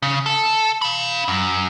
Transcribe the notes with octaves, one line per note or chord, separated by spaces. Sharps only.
C#3
A4
F5 B5
F#2